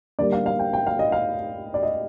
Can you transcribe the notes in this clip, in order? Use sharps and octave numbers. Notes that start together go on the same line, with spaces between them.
D3 G3 A#3 D5
F5
F5
G5
G5
F5
D#5
F5
D5
D#5